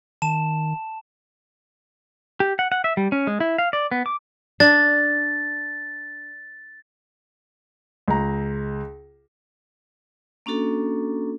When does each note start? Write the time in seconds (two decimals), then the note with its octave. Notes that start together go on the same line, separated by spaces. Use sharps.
0.22 D#3 A5 E7
2.40 G4
2.59 F#5
2.72 F#5
2.84 E5
2.97 G3
3.12 C#4
3.27 G#3
3.40 E4
3.58 F5
3.73 D5
3.91 B3
4.06 D6
4.60 D4 A6
8.08 C#2 A#5
10.46 A#3 C#4 D4 F#4 A4